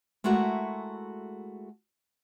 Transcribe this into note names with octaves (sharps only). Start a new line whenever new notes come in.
G#3 A3 E4 F#4 A4 A#4